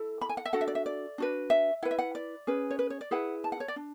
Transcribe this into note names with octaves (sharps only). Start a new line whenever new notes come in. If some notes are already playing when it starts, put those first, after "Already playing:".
Already playing: E4 A4
B5
G#5
F#5
E5
D4 F#4 A4 F#5
E5
D5
E5
D5
D4 F#4 B4
E5
E4 B4 F#5
E5
F#5
D5
C#4 G#4 B4
C#5
B4
C#5
D5
E4 G#4 B4 F#5
A5
F#5
C#5
D5
D4